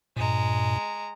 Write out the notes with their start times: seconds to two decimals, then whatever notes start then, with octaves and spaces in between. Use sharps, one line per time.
0.17 G2 A#2 G#3 A#5